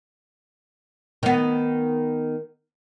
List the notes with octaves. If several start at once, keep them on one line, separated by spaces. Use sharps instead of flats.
D#3 B3